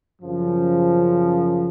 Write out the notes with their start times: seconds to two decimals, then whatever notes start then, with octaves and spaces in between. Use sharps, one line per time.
0.20 F#2 C#3 F3